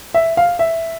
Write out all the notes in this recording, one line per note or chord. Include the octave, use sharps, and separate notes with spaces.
E5
F5
E5